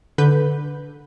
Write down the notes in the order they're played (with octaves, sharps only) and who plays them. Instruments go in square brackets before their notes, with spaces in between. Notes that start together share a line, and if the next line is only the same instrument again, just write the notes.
[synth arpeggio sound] D3 B4 G6